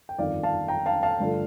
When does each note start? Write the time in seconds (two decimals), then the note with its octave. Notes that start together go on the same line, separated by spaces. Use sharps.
0.09 G5
0.18 G1 F2 D#3 D5 F5
0.43 F5 A5
0.68 G5 A#5
0.86 F5 A5
1.03 F5 A5
1.20 G2 D3 F3 A3